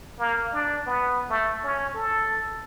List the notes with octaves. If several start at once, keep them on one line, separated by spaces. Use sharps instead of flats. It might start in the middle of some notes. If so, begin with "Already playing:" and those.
A#3
D4
B3
A3
C#4
A4